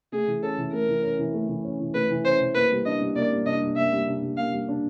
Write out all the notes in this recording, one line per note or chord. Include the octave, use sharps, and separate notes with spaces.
A3 G#4
E3
C#4 A4
E3
A3 A#4
E3
C#4
E3
A3
E3
C#4
E3
A3 B4
E3
C#4 C5
E3
A#3 B4
G3
D4 D#5
G3
A#3 D5
G3
D4 D#5
G3
A#3 E5
G3
D4
G3
A#3 F5
G3
D4